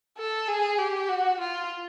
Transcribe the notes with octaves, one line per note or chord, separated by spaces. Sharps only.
A4
G#4
G4
F#4
F4